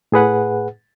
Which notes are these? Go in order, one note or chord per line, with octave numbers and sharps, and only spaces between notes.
A2 G#4 B4 F#5